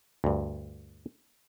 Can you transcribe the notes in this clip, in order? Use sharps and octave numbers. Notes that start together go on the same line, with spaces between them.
D2 G2